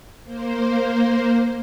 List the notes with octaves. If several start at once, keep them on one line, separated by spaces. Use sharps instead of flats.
A#3 C5